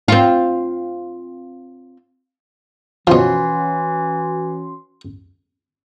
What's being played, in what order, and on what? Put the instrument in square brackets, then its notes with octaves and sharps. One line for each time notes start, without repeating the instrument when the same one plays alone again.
[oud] C4 F4
[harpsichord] B2 F3 [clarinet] E3 [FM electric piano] C#4 F#4 C6